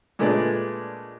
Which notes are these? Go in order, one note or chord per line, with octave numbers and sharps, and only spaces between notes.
A#2 G#3 A3 B3 D4 D5